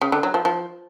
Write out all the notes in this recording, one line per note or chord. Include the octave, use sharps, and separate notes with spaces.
C#3
D3
F#3
F3
F3